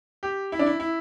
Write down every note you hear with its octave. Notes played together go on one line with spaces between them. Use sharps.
G4
E4
D4
E4
E4